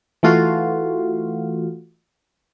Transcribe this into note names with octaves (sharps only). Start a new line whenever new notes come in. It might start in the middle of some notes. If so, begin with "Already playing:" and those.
E3 A3 F4 F#4 F5